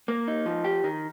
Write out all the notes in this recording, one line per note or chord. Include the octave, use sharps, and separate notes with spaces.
A#3
D#4
F3
G4
D#3